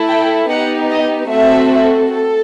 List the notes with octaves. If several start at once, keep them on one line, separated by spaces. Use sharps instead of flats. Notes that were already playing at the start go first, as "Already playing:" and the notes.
Already playing: A3 E4 A4
G5
B3 D#4 G4 F#5
D#5
A3 C4 F#4 A4 E5
A4